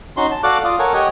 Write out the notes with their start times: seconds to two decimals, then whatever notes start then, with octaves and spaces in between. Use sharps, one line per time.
0.17 C#4 D#4 F#4 C6
0.31 A5
0.43 F#4 A4 D5 F5 D6 F#6
0.64 F4 D5 F5 D#6
0.79 A4 A#4 C#5 F#5 G#5
0.94 G4 C#5 D#5 F#5 D#6